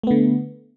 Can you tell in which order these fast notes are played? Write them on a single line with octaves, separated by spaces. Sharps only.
A3 B3 D3